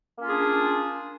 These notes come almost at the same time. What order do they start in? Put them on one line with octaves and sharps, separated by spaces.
A#3 C#4 F4 G#4 D4